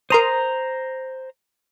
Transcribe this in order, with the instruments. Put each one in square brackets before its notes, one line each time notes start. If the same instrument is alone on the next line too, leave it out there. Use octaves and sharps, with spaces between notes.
[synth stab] A#4 C6 D#6 [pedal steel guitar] C5 A#5